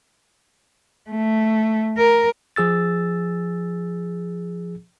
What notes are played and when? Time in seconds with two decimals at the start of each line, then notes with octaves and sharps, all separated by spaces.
1.10 A3
1.97 A#4
2.56 F3 G#4 E6 A6